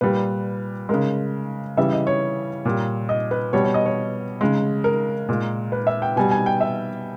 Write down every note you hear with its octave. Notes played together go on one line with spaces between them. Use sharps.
A#2 G3 B4
C#3 G#3 A#4
C#3 E3 G3 E5
D#5
C#5
A#2 G3
D#5
B4
B2 G3 C#5
C#5
D#5
C#5
C#3 G#3
A#4
A#2 G#3
B4
E5
G5
B2 G3 G#5
G#5
G5
E5